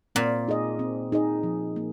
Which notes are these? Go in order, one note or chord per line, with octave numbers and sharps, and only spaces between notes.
A#2 C4
D#4 G#4 D#5
C4
D#4 G#4 D#5
F3
A#3